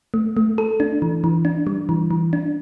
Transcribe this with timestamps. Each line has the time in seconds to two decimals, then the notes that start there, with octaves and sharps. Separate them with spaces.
0.14 A3
0.37 A3
0.58 A4
0.80 D4
1.02 E3
1.24 E3
1.45 D4
1.67 G3
1.89 E3
2.11 E3
2.33 D4